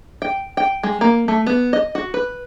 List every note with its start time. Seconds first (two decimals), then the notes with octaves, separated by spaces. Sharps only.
0.22 G5
0.57 G5
0.83 G#3
1.01 A#3
1.28 A3
1.47 B3
1.73 D#5
1.95 F#4
2.14 B4